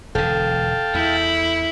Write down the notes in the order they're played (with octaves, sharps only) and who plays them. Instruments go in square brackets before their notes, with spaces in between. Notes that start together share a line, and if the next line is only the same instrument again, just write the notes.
[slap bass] E1 D3 [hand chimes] A4 [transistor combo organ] F5 G5 A5
[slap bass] E2 [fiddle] E4